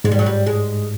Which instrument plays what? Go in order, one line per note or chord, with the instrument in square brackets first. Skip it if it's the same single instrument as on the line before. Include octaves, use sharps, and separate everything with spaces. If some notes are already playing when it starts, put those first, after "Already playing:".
[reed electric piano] G#2 [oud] G#3
[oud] G3
F#3
G3
G#3